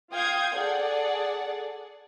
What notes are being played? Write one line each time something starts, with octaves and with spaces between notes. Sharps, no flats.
F4 F5 G5 D#6 G6 G#6
G#4 A4 D5 F#5